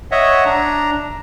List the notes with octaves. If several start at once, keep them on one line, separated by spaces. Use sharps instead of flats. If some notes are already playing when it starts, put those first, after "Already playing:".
C#5 D#5 E5 F#5
D4 A#5